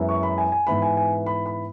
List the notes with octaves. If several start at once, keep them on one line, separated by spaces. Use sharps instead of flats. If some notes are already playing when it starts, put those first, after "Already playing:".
Already playing: F#2 E3 G#3 B3 E4
C#6
B5
G#5
G#5
G#2 E3 B3 E4 B5
G#5
G#5
B5
B5